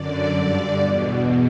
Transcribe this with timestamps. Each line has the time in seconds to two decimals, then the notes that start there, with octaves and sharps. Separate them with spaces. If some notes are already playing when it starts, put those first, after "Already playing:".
Already playing: F#2 D3 D5
0.31 G2 D3
0.76 B2
0.81 E2